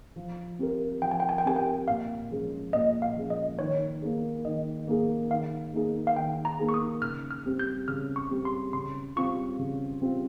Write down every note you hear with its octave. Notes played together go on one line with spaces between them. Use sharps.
F3
C4 G4 A#4
F3 G5
G#5
G5
G#5
G5
C4 G4 A#4 G#5
G5
A#2 F5
F3 G#3 C#4
A#2 D#5
F5
F3 G#3 C#4
D#5
D#3 C#5
A#3 D#4 G#4
D#3 D#5
A#3 D#4 G#4
D#3 F5
A#3 D#4 G#4
F5
D#3 G5
A#5
A#3 D#4 G#4
C#6
D#6
C#3 F6
F6
G3 C4 G4
G6
C#3 F6
C#6
G3 C4 G4
C6
C#3 C6
G3 C4 F4 C#6
C#3
G3 C4 F4